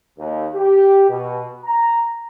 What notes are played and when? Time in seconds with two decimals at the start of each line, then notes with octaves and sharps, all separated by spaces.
0.18 D#2
0.55 G4
1.09 B2
1.65 A#5